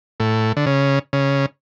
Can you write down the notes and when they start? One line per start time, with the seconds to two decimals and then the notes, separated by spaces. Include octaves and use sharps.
0.20 A2
0.57 D3
0.66 C#3
1.13 C#3